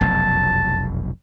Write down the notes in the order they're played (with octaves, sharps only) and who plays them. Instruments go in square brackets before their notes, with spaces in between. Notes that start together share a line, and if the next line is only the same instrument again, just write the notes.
[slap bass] F1 B1 F#2 [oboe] A5